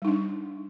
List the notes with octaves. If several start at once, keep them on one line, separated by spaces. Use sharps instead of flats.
G3 D4 D#4